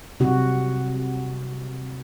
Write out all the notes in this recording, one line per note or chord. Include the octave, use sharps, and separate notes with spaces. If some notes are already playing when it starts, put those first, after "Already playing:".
C3 F#4